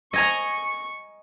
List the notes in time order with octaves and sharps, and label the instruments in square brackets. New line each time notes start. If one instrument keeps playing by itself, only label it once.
[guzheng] D#5 G#5 A#5 [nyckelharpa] C#6